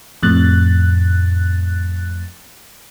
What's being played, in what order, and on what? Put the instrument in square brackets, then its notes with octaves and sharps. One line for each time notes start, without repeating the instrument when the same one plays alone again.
[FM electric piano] F2 A2 F#6 A6